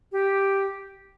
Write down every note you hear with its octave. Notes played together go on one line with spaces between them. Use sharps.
G4